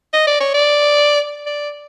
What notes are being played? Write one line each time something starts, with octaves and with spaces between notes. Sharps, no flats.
D#5
D5
C#5
D5
D5